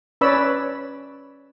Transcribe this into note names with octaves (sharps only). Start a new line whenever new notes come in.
C#4 B4 C#5 D5 B5 E6